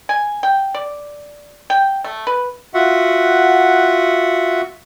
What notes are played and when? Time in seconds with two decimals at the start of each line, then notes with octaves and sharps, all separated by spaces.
0.09 G#5
0.43 G5
0.74 D5
1.70 G5
2.04 A3
2.27 B4
2.74 F4 F#4 E5 F#5